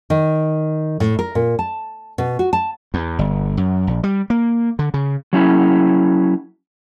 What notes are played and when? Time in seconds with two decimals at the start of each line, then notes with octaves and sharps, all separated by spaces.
0.10 D#3
1.00 A2
1.19 A#4
1.35 A#2
1.59 A5
2.18 B2
2.39 F#4
2.53 A5
2.94 E2
3.19 G1
3.57 F#2
3.87 A#1
4.04 G3
4.30 A#3
4.79 D3
4.94 C#3
5.33 F#3 C#4 E4